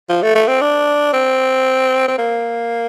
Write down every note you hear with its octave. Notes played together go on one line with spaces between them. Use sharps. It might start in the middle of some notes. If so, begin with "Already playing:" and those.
F3
A3
A3
C4
D4
C4
C4
A#3